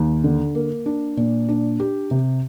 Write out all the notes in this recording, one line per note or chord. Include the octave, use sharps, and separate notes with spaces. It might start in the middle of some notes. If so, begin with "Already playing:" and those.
Already playing: D#2
D3
A#3
D4
A#2
D4
G4
C3